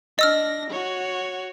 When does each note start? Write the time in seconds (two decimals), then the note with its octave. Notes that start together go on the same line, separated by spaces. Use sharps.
0.19 D4 D#5 E6 F6 A#6
0.70 F#4 C#5